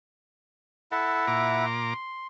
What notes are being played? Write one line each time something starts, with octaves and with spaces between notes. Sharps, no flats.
E4 A4 E5 F#5
A#2 A#5 D6
C6